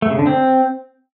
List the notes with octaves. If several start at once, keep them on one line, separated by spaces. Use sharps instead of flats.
A3
C#3
D3
C4